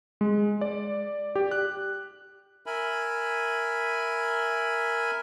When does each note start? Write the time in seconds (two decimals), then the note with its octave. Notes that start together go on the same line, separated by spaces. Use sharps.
0.21 G#3
0.61 D5
1.36 G4
1.51 F#6
2.66 A#4 E5 G#5 B5